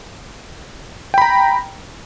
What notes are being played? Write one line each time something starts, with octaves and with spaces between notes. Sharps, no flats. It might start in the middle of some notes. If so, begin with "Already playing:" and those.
G5 A#5 B5